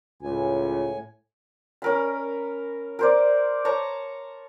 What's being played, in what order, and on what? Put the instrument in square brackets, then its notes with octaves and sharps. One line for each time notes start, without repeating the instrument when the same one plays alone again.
[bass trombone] C#2 [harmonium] A2 G#5
[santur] C#4 A#4 B5
A#4 C5 D5
C#5 A5 A#5 C#6